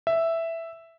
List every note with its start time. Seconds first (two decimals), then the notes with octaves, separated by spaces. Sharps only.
0.07 E5